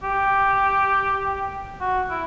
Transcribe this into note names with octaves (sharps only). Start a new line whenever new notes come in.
G4
F#4
E4